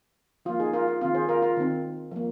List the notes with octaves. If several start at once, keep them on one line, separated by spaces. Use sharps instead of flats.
F3 A#3 F4
D#4 G#4
F4 A#4
F4
D#3 C4 F4
G#4 C5
F4 A#4
F4 A#4
D#3 C4
F3 A#3